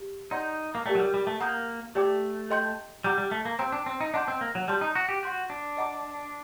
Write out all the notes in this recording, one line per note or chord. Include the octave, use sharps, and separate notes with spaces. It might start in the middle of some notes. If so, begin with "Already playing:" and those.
Already playing: G4
D#4 D5 F#5 C6 G6
A#3
A3 G4 A#4 D5 G5
F#3
G3
G3
A3
A#3 F#5 A#5 D#6 G6
A3 G4 D5 G5 D6
A4 D#5 G5 C6 G6
G3 F#5 A#5 D6 G6
G3
A3
A#3
C4 C5 G5 A#5
D4
C4
D#4
D4 D#5 F#5 C6 G6
C4
A#3
F#3
G3 D5 A5 C6 G6
D#4
F#4
G4
F#4 F#5 C6 G6
D4
D#5 F#5 A#5 D6